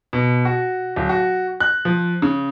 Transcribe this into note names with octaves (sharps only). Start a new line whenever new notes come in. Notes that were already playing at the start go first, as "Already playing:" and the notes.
B2
F#4
D1
F#4
F#6
F3
C#3